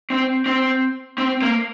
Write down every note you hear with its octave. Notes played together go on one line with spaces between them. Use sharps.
C4
C4
C4
A#3